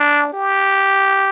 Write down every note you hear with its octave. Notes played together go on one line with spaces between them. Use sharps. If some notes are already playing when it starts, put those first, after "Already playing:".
Already playing: D4
G4